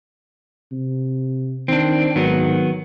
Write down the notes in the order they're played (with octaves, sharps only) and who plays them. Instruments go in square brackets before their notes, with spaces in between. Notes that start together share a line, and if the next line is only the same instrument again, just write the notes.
[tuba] C3
[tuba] D#3 [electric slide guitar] C4 D4
[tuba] G#1 [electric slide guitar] D#3 F#3 B3